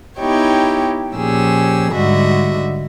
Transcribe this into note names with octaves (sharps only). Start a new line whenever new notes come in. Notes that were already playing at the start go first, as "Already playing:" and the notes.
B3 D#4 E4 G4 C#5 G5
A#2 F3 C#4 G4 G#4 E6
G#2 D3 G3 F#4 D#5 E5